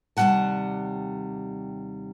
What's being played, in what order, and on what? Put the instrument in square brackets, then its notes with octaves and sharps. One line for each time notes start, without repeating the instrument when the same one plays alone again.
[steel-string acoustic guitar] D#2 C3 G3 D4 F#5 A5